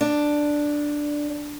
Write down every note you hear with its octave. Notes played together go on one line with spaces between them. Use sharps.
D4